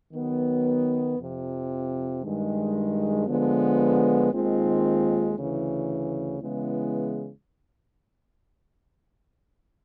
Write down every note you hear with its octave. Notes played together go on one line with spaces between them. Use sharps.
D#3 F#3 B3
F2 C3 F3
G2 D#3 G#3
D3 F3 G#3 B3
D#2 D#3 G#3 C4 F4
D2 C#3 E3
C#3 E3 G#3 B3 E4